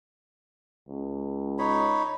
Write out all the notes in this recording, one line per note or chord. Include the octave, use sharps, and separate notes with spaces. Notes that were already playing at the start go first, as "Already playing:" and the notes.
C#2
D#4 C#5 B5